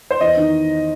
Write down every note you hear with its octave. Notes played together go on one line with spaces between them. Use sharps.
C5
E2 D#5
D#3